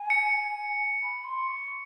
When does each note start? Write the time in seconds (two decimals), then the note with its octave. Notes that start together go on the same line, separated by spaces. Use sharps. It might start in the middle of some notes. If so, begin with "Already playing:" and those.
Already playing: G#5
0.10 C#7
1.02 B5
1.24 C6
1.48 C#6